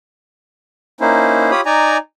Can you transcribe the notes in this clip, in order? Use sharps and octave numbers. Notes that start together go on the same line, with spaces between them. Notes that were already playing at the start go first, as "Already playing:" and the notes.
A#3 C#4 D#4 E4 C5
F4 G4 C#5 B5 D#6
D#4 D5 G#5 A#5